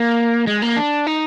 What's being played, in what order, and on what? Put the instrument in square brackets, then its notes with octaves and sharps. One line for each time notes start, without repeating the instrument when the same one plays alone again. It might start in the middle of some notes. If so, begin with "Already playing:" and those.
Already playing: [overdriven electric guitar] A#3
G#3
A#3
D4
D#4